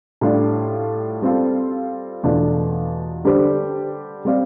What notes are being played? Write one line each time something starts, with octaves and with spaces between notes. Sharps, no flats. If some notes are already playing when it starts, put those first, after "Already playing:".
A2 G3 D4 F4
G3 C4 F4 A4
E2 B2 A3 D4 F4
D3 G3 D4 G4 C5
G3 C4 G4 D5 F5